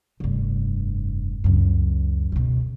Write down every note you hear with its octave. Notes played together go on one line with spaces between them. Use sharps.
F1 G2
C#2 F#2
C#2 B2